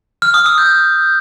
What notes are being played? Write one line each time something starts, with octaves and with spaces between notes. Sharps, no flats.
F6
D#6
E6
G6